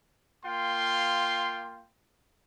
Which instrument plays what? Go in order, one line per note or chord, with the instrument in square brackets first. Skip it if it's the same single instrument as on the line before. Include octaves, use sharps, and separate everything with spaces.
[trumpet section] A#3 F4 F5 G5 C6